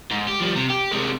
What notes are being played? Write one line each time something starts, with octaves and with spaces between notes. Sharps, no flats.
G#2
G4
F3 G3
C3
G4
C3 G#3